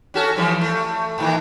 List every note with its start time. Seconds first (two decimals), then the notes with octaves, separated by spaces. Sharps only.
0.14 C#4 F#4 A4
0.36 E3 F3 G3
0.61 A3
1.18 A2 D#3 E3